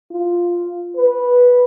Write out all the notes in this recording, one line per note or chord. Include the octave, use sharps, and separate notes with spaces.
F4
B4